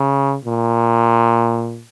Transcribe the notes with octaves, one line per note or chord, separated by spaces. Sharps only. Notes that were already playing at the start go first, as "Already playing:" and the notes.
Already playing: C#3
A#2